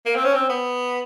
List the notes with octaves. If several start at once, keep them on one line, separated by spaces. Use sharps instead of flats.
A#3
C4
C#4
C4
B3